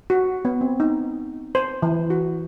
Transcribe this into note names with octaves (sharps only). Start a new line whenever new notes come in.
F#4
B3
C4
D#4
C5
E3
F#4